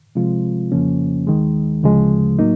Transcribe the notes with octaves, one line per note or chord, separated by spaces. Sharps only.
C3 F3 G#3 C4 F4
F2 C#3 F3 A#3 C#4
D#2 D#3 G#3
D2 C#3 F3 G#3
A2 F#3 A#3 D#4